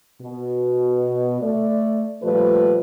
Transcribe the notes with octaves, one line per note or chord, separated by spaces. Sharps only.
B2
A3 D5
A#2 F3 G3 A3 B4